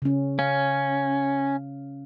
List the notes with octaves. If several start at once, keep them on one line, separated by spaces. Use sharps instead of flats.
C#3 C#4
C#4 F5